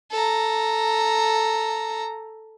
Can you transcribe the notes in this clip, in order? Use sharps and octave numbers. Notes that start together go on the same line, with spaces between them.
A4 A#5